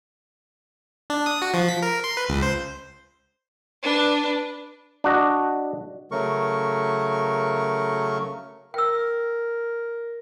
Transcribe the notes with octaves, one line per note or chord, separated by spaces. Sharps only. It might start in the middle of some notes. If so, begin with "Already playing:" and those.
D4
D#6
F#4
F3
B6
A#4
C6
B4
C#2
C5
D4 B4
D4 F#4 D#5
C#3 F#3 A3 A#4 C#6
A#4 G5 E6